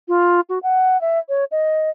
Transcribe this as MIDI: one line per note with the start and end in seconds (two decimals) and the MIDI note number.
0.08 0.41 65
0.49 0.59 66
0.63 0.99 78
1.01 1.19 76
1.29 1.44 73
1.51 1.90 75